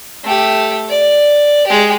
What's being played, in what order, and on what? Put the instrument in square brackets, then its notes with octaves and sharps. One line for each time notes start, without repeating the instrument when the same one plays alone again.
[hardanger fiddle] A3 G4
D5
G#3 G4